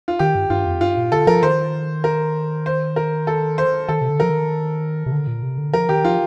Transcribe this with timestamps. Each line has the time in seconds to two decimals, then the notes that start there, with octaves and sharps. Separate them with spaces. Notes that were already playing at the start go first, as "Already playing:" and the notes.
0.08 F4
0.19 D#3 G4
0.35 G2
0.50 G2 F4
0.66 F2
0.81 G2 F4
0.97 A#2
1.12 D3 A4
1.27 F3 A#4
1.43 D#3 C5
2.04 A#4
2.66 C5
2.96 A#4
3.27 A4
3.58 C5
3.88 D#3 A4
4.01 C3
4.09 D3
4.20 F3 A#4
4.30 D#3
5.06 C3
5.12 D3
5.27 A#2
5.43 C3
5.58 D3
5.74 F3 A#4
5.89 D#3 G4
6.04 F3 F4